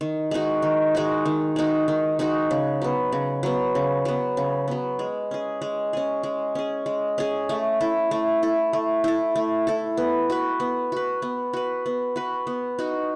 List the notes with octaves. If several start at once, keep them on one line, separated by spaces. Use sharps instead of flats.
D#3
G#3 D#4 F#4
D#3
G#3 D#4 F#4
D#3
G#3 D#4 F#4
D#3
G#3 D#4 F#4
C#3
F#3 B3
C#3
F#3 B3
C#3
F#3 B3
C#3
F#3 B3
G#3
C#4 G#4
G#3
C#4 G#4
G#3
C#4 G#4
G#3
C#4 G#4
A3
E4 A4
A3
E4 A4
A3
E4 A4
A3
E4 A4
B3
F#4 B4
B3
F#4 B4
B3
F#4 B4
B3
F#4 B4
B3
D#4 F#4